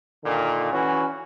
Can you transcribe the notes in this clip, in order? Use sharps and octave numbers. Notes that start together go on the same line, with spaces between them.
A#2 D3 D#3
E3 C#4 F#4